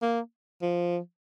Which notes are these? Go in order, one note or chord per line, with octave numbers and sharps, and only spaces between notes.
A#3
F3